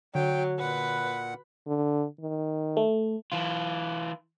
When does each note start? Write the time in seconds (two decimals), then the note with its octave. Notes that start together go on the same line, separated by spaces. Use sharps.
0.15 D3 F#3 G5
0.60 A#2 B4 F#5
1.67 D3
2.20 D#3
2.77 A3
3.32 E3 F4